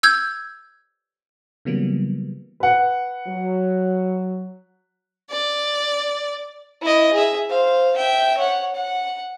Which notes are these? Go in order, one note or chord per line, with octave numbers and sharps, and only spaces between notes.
E6 G6 G#6
C#3 E3 F#3 G3 A#3 B3
B4 F#5
F#3
D5
E4 D#5
G#4 E5
C5 F5
E5 G5
C#5 F#5
F#5